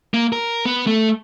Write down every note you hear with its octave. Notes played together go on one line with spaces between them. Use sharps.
A#3
A#4
B3
A3